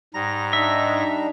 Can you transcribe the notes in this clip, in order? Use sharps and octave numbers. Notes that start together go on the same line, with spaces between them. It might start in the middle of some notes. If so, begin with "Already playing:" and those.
G#2 G3 A#5 A#6
D4 D#4 E5